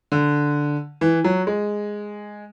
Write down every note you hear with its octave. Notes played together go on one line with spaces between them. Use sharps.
D3
E3
F#3
G#3